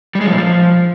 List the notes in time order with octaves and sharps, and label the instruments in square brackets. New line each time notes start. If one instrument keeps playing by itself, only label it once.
[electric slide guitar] G3
G#3
F3
A#2
F3